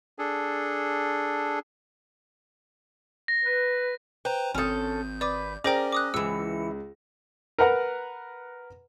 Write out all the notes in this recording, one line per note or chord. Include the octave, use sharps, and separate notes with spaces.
D4 G#4 A4
A#6
B4
B4 C5 G5 A#5
G#1 C4 C#4 A4 D#6 G6
B4 D5 D6
C#4 G#4 A#4 C5 D5 G5 A#6
D6 D#6 F#6
C#2 E3 E5 E6 C#7
A#4 B4 F#5 A#5